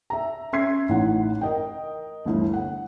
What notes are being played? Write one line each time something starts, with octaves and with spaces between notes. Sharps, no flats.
E5 A#5
C#4 E5 C6 G#6 C7
A1 D#4 E4 F#5
A#4 D#5 G5
G1 D2 E3
F#5